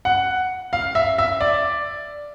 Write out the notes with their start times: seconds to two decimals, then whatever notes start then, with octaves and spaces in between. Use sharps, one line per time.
0.05 F#5
0.73 F5
0.95 E5
1.18 E5
1.41 D5